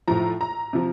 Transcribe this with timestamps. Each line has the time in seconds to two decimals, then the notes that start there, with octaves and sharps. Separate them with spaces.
0.08 A2 F3 A#5
0.41 A#5
0.73 C3 F3